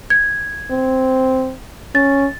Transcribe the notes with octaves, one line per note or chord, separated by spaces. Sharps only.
G#6
C4
C#4 A6